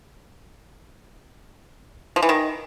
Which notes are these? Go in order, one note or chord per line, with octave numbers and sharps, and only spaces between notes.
F3
E3
D#3